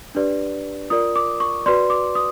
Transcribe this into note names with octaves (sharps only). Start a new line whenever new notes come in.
D4 G4 B4 D5
F4 A#4 D5 D#6
D6
C#6
F#4 B4 D5 C6
D6
D#6